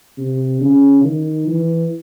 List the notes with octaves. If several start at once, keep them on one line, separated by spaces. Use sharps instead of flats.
C3
C#3
D#3
E3